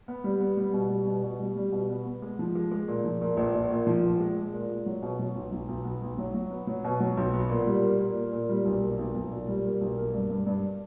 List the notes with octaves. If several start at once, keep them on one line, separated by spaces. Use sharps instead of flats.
B3
G3
B3
G3
B2
G3
B2
B2
G3
G3
B2
B3
B3
G#3
F3
G#3
G#3
A#2
F3
A#2
A#1
A#1
A#2
F3
A#1
G#3
G#3
A#2
G#3
F#3
B2
F#3
B1
B1
B1
B3
B1
F#3
F#3
B3
F#3
B2
F#3
B1
B3
A#2
G3
A#3
A#2
A#3
A#2
G3
B1
A#3
B1
B1
A#2
G3
A#3
B1
A#3
G2
G2
G2